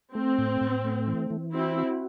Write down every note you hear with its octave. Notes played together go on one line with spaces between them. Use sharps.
A3 C4
A2
A2
A3
E3
E3
C4 E4 F#4
F#4